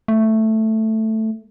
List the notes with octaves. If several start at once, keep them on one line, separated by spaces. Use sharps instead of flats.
A3